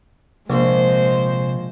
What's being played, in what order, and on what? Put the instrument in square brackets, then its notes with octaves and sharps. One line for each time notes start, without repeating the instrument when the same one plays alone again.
[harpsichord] A#1 [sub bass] C3 [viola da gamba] G#3 C5